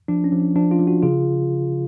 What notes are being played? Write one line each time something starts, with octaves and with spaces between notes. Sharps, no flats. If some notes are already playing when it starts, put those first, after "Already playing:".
F3 D4
C#4
F3
D4
F3 D4
C#4 F4
F3
D4 F#4
C#3 F4 G#4